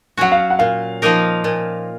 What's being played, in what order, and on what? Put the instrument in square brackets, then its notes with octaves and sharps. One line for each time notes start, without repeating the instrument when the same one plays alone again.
[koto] F#3 C#4 F#4 [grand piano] F#5
[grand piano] F5
F#5
[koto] A#2 [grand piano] F5
[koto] F3 A#3 D#4 A#4
A#2